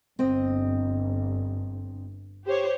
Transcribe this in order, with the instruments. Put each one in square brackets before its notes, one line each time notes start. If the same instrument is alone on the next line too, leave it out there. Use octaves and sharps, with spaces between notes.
[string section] G1 [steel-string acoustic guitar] C4 D#5
[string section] G4 C5 C#5